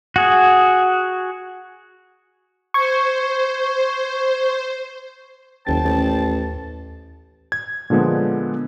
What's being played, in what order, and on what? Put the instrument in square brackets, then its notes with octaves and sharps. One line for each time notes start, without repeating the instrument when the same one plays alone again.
[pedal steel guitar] F#4 G#4
[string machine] C5 [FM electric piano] C#6 G#6
[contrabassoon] F#1 [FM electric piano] D#2 A6 [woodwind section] C5 G5 A5
[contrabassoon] A1
[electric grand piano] G#6
A#2 D3 F3 G#3 B3